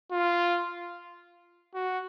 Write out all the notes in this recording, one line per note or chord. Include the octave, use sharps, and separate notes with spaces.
F4
F#4